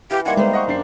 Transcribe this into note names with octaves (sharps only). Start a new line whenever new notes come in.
E3 G4 F5
D#3 G3 A#3 F#5 G#5 C6 G#6
G3 G#3 B3 C5 A#5
D#5 F#5 C#6
F#2 D4 C7